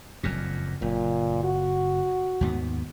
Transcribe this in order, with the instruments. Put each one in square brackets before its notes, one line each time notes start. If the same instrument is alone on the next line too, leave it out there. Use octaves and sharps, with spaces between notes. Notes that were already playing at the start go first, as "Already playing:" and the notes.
[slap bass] F#1 F2 A#2
[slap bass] F#1 [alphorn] A#2
[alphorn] F#4
[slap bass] D#2 G#2 B3